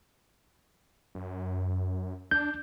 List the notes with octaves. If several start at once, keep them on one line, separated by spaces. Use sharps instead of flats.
F#2
D4 G6